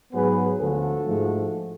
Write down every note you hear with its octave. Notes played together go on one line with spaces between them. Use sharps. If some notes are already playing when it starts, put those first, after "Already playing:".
G#2 F#3 B3 G#4 B4
D2 D3 F3 F#4 A4
G#2 F3 A3